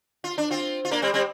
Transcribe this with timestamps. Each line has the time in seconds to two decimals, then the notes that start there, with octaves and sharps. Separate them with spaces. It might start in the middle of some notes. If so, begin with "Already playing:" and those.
0.24 F4
0.38 D4
0.51 C4 F4
0.85 F4
0.91 A#3 D4
1.02 G3 C4
1.14 G3 C4